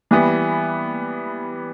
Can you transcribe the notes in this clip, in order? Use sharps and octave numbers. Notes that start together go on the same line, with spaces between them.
E3 G3 B3